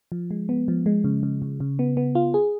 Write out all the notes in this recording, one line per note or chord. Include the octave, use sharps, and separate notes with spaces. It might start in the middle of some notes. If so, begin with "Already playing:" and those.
F3
G#3
B3
F3
G#3
C#3
C#3
C#3
C#3
B3
B3
F4
G#4